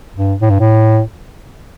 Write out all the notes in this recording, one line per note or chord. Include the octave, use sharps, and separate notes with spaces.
G2
A2
G2
A2